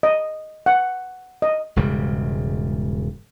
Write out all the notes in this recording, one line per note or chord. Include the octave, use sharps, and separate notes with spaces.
D#5
F#5
D#5
E1 G#2 C#3 G3